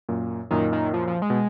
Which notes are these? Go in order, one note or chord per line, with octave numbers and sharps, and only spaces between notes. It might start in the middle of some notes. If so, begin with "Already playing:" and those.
F#2 A#2
F#2 A#2 D#3
D#3
F3
F3
G#3
B2